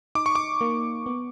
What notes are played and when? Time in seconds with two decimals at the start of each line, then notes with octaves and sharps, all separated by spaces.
0.15 D#4 D6
0.26 C#6
0.35 D6
0.61 A#3
1.06 B3